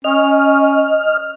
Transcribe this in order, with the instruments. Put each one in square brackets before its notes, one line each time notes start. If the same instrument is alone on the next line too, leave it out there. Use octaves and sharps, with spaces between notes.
[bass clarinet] C#4 [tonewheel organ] D#5 F6